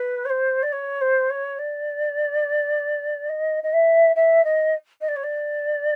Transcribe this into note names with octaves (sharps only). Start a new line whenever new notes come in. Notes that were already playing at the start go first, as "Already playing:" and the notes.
Already playing: B4
C#5
C5
D5
C#5
C5
C#5
D5
D#5
D#5
E5
E5
D#5
D#5
D5
C#5
D5